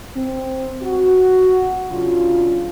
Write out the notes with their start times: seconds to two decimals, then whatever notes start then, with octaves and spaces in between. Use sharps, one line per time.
0.16 C4
0.82 F#4
1.91 C#3 F#3 D4 F4